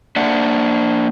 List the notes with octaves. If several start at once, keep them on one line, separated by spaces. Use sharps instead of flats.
A#3 D4 E5 F#5